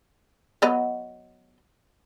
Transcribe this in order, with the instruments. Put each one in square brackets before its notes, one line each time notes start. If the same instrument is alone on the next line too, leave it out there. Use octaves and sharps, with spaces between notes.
[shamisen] F#3 B3 D#5